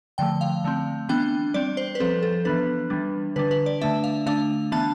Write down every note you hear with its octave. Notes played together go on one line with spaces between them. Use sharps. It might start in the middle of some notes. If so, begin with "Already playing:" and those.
D3 F3 A3 G5
F5
D3 A3 C4
E3 B3 D4 G5
G3 C4 D5
C5
B4
F3 C4 A4
A4
E3 B3 D4 B4
E3 G3 D4
D3 G3 D4 B4
B4
D5
D3 A3 D4 E5
F5
D3 A3 D4 F5
E3 B3 D4 A5